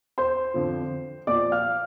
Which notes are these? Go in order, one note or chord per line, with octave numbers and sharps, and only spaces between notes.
C5 C6
F2 D3 F3
A#2 F3 D5 D6
F5 F6